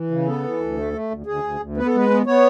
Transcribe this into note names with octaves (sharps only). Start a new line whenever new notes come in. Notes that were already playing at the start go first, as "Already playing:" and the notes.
Already playing: E3
C#3
B3 A4
E3
D2
A3
A3
D2
D2 G#4
D2
D2
B3 B4
A4
G#3 B4
B3
B3 C#5